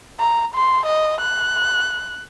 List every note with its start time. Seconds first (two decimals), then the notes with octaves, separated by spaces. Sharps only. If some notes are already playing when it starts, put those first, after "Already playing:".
0.19 A#5
0.55 C6
0.86 D#5
1.21 F#6